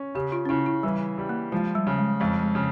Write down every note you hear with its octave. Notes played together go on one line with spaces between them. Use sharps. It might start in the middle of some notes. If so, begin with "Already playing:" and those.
Already playing: C#4
C#3 G4
F4
C#4
C#3 E4
E4
E3 G3
G3
A#3
F3 G#3
G3
C#3
G#3
F2 G#3
G#3
C#3